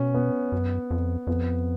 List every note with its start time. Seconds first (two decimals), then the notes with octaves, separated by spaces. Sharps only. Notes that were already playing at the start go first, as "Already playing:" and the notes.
Already playing: B2 C#4
0.15 B3
0.52 F#2
0.91 F2
1.27 F2 B3